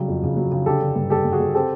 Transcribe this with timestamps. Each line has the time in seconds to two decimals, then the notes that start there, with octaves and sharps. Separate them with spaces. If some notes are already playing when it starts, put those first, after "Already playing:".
Already playing: C#3 F#3 G3
0.08 F2
0.23 C#3
0.37 F#3
0.52 C#3
0.66 D3 G4 A4
0.81 D3
0.95 G2
1.10 G2 G4 A4
1.25 G2
1.32 F#4 G#4
1.39 G2
1.54 C4 G4 A4